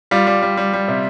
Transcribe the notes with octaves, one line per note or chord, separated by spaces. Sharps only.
G3 F4
G3
G3
G3
G3
C3